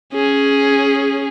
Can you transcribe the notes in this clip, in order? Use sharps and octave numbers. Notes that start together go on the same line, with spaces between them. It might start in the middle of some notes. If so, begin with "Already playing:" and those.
C#4 G#4